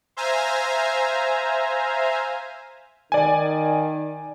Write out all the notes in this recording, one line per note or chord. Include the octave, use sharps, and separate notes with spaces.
C5 E5 F5 G#5 A#5
D#3 D5 G#5